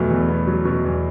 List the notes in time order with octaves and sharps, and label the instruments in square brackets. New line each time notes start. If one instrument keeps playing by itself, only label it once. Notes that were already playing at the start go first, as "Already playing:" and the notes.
Already playing: [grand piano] E2 B2 F#3 B3 [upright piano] A3
[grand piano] E2
B3
F#3
B2
E2